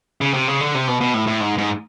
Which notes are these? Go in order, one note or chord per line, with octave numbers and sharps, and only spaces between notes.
C#3
C3
C#3
D3
C3
B2
B2
A2
A2
G#2
G#2